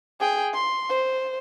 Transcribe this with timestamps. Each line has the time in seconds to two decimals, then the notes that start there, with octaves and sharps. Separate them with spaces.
0.20 G#4 G5
0.54 C6
0.89 C5